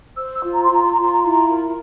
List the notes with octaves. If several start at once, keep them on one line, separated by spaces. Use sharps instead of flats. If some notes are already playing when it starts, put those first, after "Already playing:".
C5 E6
E6
F4
A#5
C6
F4 A#5
C6
A#5
F4 C6
A#5
E4 C6
A#5
A#4